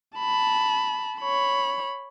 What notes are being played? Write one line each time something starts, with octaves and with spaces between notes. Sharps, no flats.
A5 B5
C#5 B5